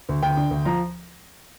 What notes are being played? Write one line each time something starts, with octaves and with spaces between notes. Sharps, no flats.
D2
D2 G5
D3
D2
F3 A#5